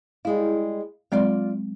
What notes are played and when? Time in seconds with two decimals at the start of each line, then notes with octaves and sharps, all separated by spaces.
0.25 G3 G#3 E4 F5
1.12 F#3 G#3 C4 F4 D5 F5